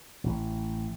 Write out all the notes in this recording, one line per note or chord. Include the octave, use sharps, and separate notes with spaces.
A1